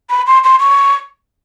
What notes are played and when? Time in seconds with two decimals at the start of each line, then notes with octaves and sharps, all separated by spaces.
0.10 B5
0.27 C6
0.44 C6
0.60 C#6